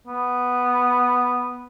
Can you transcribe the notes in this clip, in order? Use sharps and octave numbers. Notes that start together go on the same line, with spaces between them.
B3